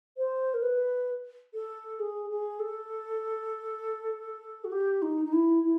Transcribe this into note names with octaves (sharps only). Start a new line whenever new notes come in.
C5
A#4
B4
A4
G#4
G#4
A4
F#4
G4
D#4
D#4
E4
E4